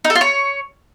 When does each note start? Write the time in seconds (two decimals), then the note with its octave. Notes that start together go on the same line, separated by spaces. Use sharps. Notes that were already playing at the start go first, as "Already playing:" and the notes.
0.04 D#4
0.10 A4
0.15 F4
0.21 C#5